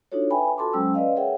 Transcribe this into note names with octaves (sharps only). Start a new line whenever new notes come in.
D4 D#4 F4 F#4 A4 C#5
B4 E5 G5 G#5 B5
F4 F#4 A4 A5 C6 D6
F#3 G#3 C#4 C5 G5 E6
B4 D5 D#5 F5
G#4 A#4 C#5 E5 F#5 G5